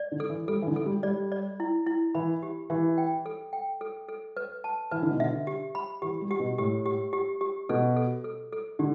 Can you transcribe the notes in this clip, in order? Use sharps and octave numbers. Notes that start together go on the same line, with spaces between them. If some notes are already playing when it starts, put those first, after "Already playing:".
Already playing: D5
D3
A4
E3
G3 A4
E3
D3
A4
G3
G3 D5
D5
E4
E4
E3 B5
G4
E3 G4
G5
A4
G5
A4
A4
B4
A5
E3 B4
D3
B2
D3 E5
G4
B5
E3 G4
G3
G4
B2
A2 G4
G4
G4
G4
B2 A4
A4
A4
A4
D3 G4